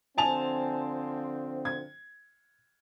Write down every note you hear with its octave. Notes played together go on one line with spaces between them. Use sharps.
D3 F3 C4 G#5 A5 F7
G#6